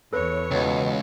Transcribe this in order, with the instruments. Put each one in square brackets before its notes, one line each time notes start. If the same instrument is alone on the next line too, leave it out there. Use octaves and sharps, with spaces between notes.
[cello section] E2 C#5 [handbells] A4 B4
[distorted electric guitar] C#2 [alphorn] B2